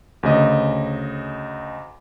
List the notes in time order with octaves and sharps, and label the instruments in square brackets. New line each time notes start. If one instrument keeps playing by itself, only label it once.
[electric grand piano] D2 C#3 D#5